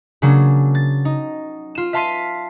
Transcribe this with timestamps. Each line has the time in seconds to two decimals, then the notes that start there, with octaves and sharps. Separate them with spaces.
0.22 C#3 F#3 A#3 D4
0.75 A6
1.05 D#4
1.75 F4 E7
1.93 E5 F5 A5 C6 B6 D#7